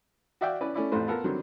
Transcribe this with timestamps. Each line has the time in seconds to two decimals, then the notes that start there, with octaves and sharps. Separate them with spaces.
0.41 F#4 D5 E5 F5 G5
0.61 C#4 E4 B4 D5
0.74 A3 C#4 E4 D5
0.92 A1 F2 A2 A3 B4 C5
1.08 B3 F4 A4 A#4
1.24 D3 D#3 F#3 G3 C4 D4